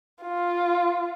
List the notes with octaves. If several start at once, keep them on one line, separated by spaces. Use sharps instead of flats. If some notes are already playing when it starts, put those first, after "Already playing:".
F4